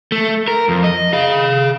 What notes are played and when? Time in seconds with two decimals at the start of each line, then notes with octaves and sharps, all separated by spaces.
0.12 A3
0.48 A#4
0.69 F2
0.84 D#5
1.13 G#4 F5